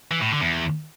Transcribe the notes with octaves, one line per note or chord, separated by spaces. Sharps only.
E3
A2
D3
E2